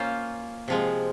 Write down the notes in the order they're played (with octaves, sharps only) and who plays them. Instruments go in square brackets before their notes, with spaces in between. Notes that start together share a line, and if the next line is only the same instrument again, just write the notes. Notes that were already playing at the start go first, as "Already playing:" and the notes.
Already playing: [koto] A#3 C#4 F4 C5
C3 F3 G#3